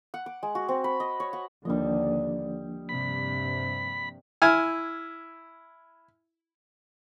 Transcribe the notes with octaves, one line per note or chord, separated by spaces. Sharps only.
F#5
D6
G#3
F#4
C4
B5
D#5
C#5
F#5
D#2 D3 F3 G3 A#3 D4 D#5
G2 C3 B5
E4 G#5 F6